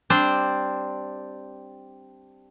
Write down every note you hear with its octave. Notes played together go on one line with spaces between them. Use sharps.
G3 C4 D4 C5